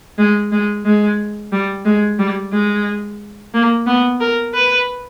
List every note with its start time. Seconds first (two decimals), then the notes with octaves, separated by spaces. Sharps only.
0.18 G#3
0.52 G#3
0.85 G#3
1.52 G3
1.85 G#3
2.19 G3
2.53 G#3
3.54 A#3
3.87 B3
4.21 A#4
4.54 B4